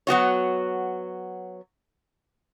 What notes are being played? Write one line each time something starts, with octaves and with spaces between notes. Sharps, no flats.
F#3 B3 F#4 C#5